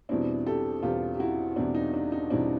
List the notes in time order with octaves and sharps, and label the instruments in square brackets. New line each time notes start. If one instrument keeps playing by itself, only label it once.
[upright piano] E2 B2 G3 C4 D4 E4
G4 A4
E2 B2 G3 C4 F4 G4
G4
E4 F#4
E2 B2 G3 C4 D4 E4
D#4
D4
D#4
E2 B2 G3 C4 D4 E4